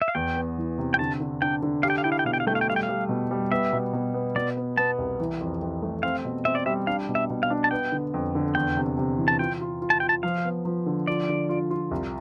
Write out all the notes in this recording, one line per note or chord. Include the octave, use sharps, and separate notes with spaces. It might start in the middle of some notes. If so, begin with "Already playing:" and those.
E5
F5
E2 G5
B3
E3
C3
G5
D3 A5
D3
D4 G5
D3
G4 F5
G5
F5
E4 G5
F5
G5
B2 F5
G5
F5
A3 G5
F5
G5
G3 F5
G5
F5
G3
B2
G3
B3 E5
B2
B2
B3
B2 D5
B3
B3 A5
C2
E3
F2
F2
A3
C4 F5
B2
C4 E5
D5
G3 E5
D4 F5
B2
E5
B2
F5
D4
A5
B3 G5
D3
F2
D3
E2 G5
C3
C3
E3
A5
F4 G5
F4
F4
A5
F4 G5
A5
F3 F5
B3
F3
D3
F4 D5
D3
F4
F4
C2